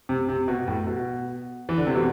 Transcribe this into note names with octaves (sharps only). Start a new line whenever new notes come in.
C3
C3
B2
A2
B2
E3
D3
C3
B2